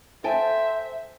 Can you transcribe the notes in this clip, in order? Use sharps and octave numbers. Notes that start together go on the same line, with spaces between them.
A4 C5 E5 G5 G#5